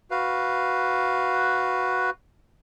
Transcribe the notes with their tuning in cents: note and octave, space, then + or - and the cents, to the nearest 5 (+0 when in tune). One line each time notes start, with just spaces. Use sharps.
F#4 +0 B4 +0 F5 +0